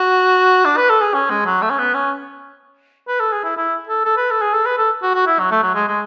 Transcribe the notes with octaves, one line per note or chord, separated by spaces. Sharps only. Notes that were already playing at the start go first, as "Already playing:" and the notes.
Already playing: F#4
D4
B4
A4
G#4
C#4
G#3
F#3
A3
C#4
B3
C#4
B4
A4
G#4
E4
E4
A4
A4
B4
A4
G#4
A4
B4
A4
F#4
F#4
E4
F#3
A3
F#3
G#3
G#3